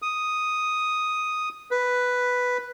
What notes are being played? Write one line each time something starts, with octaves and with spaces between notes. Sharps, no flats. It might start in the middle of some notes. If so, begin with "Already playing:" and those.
D#6
B4